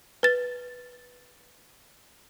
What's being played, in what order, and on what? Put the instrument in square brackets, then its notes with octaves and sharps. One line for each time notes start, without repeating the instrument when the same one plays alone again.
[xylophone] B4 A6